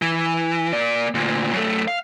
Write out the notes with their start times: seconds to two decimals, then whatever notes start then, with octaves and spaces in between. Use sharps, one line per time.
0.02 E3
0.73 A#3 D5
1.15 D2 A#2
1.53 F#2 A3
1.88 F5